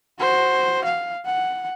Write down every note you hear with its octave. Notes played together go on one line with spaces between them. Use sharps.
F#4 C5
F5
F#5